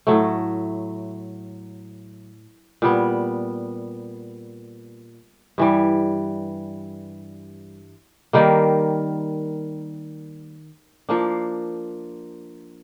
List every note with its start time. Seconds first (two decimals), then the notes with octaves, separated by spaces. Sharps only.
0.07 A2 F#3 A3
2.82 A#2 G3 B3
5.58 G2 E3 G3
8.33 D#3 G3 A#3
11.09 F3 A#3 D4